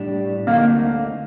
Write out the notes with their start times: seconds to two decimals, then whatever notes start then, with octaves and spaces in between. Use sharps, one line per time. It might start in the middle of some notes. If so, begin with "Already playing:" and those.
Already playing: A2 G3 D4
0.47 D2 D3 A3 A#3 C4 D#4